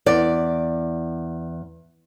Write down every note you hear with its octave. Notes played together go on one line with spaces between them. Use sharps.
E2 D5